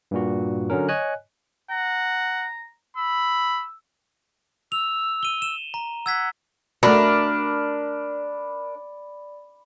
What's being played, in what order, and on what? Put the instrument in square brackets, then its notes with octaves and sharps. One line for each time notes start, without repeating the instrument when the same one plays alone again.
[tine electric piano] G2 A#2 F#4
D3 F#3 C#4 A#4
C#5 D#5 G#5 F#6
[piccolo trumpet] F#5 [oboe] A#5
[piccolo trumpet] B5 [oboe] E6
[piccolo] E6 [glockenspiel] F7
[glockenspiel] D#7 G7
E7
A#5
[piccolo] F#5 [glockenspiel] E6 G#6 B6
[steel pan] A3 F#4 [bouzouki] D4 A#4 [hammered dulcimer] D5 B5